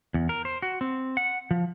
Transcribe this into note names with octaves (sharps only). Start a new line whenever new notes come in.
E2
A#4
C5
F#4
C4
F#5
F3